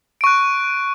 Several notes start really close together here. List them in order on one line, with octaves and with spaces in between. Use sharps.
D7 C#6 F#6